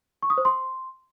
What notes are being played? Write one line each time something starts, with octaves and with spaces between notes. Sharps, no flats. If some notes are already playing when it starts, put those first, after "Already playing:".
C#6
D#6
C5
C6